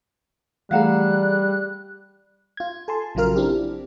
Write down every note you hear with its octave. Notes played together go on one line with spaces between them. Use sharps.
E3 G3 A3 G#4 F5 F#5 A#5 F#6
F4 G#6
A4 G#5 A5 C6
A#1 C#3 F#3 F4 A#4 F6
C4 D4 E4 G4